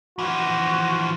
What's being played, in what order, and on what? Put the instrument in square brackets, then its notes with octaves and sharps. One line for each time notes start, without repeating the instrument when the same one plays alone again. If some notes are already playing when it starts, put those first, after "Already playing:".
[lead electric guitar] E3 F3 [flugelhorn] F#4